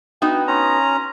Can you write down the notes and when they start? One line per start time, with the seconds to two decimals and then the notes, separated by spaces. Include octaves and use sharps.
0.22 B3 D#4 F#4 G5
0.48 C#4 A#5 C6